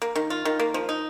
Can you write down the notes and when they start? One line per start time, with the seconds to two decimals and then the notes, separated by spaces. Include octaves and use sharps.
0.02 A#3
0.16 D#3
0.30 F4
0.45 D#3
0.60 A#3
0.74 F3
0.89 D#4